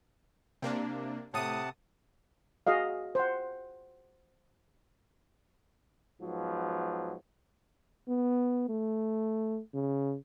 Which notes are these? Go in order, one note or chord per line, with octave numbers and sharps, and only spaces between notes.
C3 A#3 D4
A2 C3 F#5 A5 D#6
F#4 G#4 D#5 F5
C5 F#5
G#2 F3 F#3 B3
B3
A3
C#3